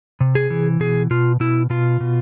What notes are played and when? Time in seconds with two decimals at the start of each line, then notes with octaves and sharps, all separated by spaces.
0.21 C3
0.35 G#4
0.50 E3
0.80 B2 G#4
1.10 B2 F4
1.40 B2 E4
1.70 B2 F4
2.00 B2